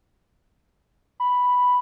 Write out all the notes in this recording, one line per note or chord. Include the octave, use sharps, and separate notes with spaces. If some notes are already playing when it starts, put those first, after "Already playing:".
B5